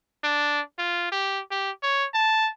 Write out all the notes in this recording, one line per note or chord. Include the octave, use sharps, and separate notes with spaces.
D4
F4
G4
G4
C#5
A5